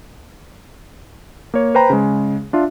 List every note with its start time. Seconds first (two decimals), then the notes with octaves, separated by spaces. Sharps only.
1.54 A#3 C#5
1.75 B4 C5 G5 A#5 B5
1.90 C#3 G#3
2.53 D4 F4 E5